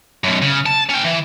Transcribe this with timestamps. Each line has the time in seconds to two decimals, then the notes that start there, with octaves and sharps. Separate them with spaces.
0.24 F#2 B2
0.42 C#3
0.66 A5
0.89 C#4 G5
1.05 E3